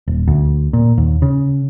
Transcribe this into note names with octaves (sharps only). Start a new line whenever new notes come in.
D#1
D2
A#2
D#2
C#3